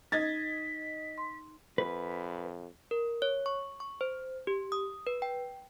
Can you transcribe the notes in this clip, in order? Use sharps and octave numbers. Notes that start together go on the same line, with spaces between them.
D#4 D#5 G#6 A6 B6
C6
F2 B4
A#4
C#5
C#6
C#6
C5
G4
D#6
B4
G5